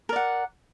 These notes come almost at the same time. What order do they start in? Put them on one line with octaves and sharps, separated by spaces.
A#4 D5 F#5